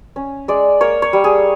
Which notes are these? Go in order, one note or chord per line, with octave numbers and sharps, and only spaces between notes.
C#4
G#3 D5
A#3 C#5
C#5
G3
G#4